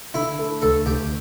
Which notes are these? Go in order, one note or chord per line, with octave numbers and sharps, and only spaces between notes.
D3 E4
A3
D2 A4
D2 G4